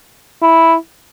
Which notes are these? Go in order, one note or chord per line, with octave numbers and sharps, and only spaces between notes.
E4